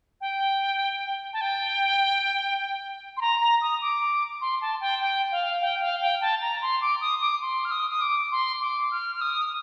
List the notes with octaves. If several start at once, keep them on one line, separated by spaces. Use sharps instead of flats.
G5
A5
G5
C6
A#5
A#5
D#6
D6
C6
A5
G5
G5
F5
G5
F5
G5
A5
A#5
C6
D6
D#6
D6
C6
F6
D#6
D#6
D6
C6
D6
F6
F6
D#6